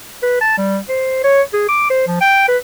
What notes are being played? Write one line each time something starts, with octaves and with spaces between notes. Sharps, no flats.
B4
A5
G3
C5
C#5
G#4
D6
C5
F3
G5
B4